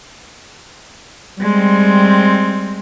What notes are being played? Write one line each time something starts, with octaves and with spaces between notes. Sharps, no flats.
G3 G#3 C4